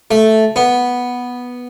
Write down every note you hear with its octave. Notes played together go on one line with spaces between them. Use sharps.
A3
B3